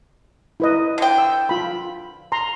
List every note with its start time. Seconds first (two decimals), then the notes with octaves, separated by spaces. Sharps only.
0.60 E4 B4 D#5
0.98 D3 G5
1.18 E6
1.49 F4 B5
2.32 A#5 C6